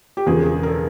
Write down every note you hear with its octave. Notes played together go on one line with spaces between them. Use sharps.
G4
E1 E2 C#3 F3 G#4
A#4
A4